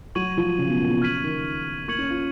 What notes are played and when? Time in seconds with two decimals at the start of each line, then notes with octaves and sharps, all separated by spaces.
0.15 F#3 C#6 G#6 D#7 F#7
0.37 F3
0.59 C#3
0.69 B2
0.80 A#2
0.91 B2
1.02 C#3 F6 G#6 B6 D#7 F#7
1.24 D#3
1.88 A#3 C#6 G#6 C#7 F#7
1.98 C#4
2.10 F4